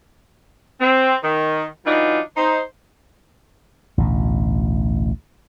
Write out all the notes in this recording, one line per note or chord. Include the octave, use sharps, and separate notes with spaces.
C4
D#3
E3 F#3 D4 D#4 F4
D#4 C5
A1 D2 B2